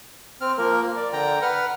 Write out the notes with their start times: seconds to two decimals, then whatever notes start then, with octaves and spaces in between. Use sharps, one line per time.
0.41 C4 F6
0.58 F3 A#3 A#4
0.81 A#3
0.96 D5
1.13 D3 G5 A#5
1.42 B4 F#5 F6